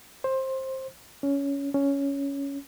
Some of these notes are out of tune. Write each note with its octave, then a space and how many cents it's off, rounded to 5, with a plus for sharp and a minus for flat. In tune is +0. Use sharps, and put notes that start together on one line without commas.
C5 +15
C#4 +15
C#4 +10